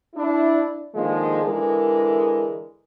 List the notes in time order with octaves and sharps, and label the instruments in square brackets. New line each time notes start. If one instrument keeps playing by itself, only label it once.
[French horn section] D4 E4
D3 D#3 F3 G#3 A#3
D3 E3 G#3 A#4